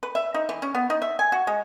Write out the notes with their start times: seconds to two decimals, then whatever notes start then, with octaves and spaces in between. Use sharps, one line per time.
0.03 B4
0.15 E5
0.34 D#4
0.49 E3
0.62 C#4
0.75 B3
0.90 D#4
1.02 E5
1.19 G#5
1.32 F#4
1.47 G#3